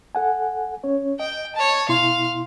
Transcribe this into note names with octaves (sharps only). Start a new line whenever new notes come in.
A4 F#5 G#5
C#4 C#5
D#5 G5
C#5 A5
B2 E4 F5 C6